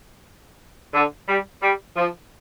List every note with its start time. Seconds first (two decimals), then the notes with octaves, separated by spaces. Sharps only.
0.94 D3
1.27 G3
1.62 G3
1.96 F3